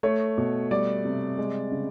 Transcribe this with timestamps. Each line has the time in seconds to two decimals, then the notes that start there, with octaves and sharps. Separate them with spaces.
0.03 A3 C#5
0.38 B2
0.71 G3 D5
1.05 C3
1.38 G#3
1.72 C#3